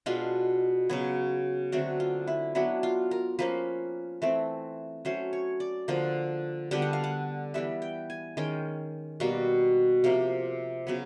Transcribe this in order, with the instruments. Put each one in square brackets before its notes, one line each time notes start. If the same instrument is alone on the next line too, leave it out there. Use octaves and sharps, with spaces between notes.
[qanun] B2 G#3 B3 D4 F4
C#3 F#3 B3
D3 F#3 A3 C4 F#4
F4
E4
F#3 B3 D4 E4
F4
A#4
F3 A#3 C#4 B4
E3 A3 C4
F#3 A3 C#4 C5
C#5
D5
D3 F3 A#3
D3 G3 B3 D4 G5
F#5
F5
F#5
E3 G3 B3 E5
G5
G#5
D#3 G#3 C#4 G5
B2 G3 A#3
C3 F3 A#3
C#3 F#3 B3